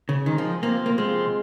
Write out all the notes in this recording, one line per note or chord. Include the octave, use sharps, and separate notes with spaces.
C#3
D#3 G#3 C4 D#4 A#4
F3
C3 F3 A#3 C4 F4
A#3
C3 F3 G#3 C4 F4